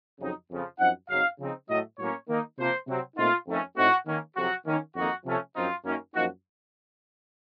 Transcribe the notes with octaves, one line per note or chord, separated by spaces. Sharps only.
F2 C#3 F#3 C4 D#4
F2 C#3 F3
F#2 F3 C4 D#4 F#5
F#2 C#3 F#3 C4 D#4 F5
C#3 F3 C4 D#4
A2 F#3 A3 D#5
A2 F#3 A#3 C#4 C#5
D#3 A#3 D#4
C3 F3 A#3 C5
C3 F#3 C4
A#2 A3 C4 D#4 F4
F2 D#3 A3 C#4
A2 A3 C4 D#4 F#4
D#3 A#3 C#4
F2 C3 F#3 F#4
D#3 A#3 C#4
F2 D#3 A#3 D#4 F#4
C3 F3 A3 C#4
F#2 F3 C4 D#4 F4
F#2 D#3 A#3 C#4
F#2 F3 A#3 D#4 F#4